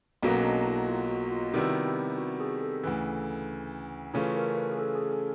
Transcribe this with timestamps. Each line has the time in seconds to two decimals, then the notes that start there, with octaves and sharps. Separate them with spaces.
0.23 B1 B2 F#3 A#3 C#4
0.44 D4
0.66 E4
0.88 F4
1.10 F#4
1.31 F4
1.53 C3 D#3 G3 B3 E4 F#4
1.86 G4
2.18 F#4
2.40 G#4
2.61 A4
2.84 D2 C#3 E3
4.14 C#3 E3 A3 C#4 F4 B4
4.36 A#4
4.57 B4
4.72 G#4
4.79 A4
4.95 G#4
5.12 A4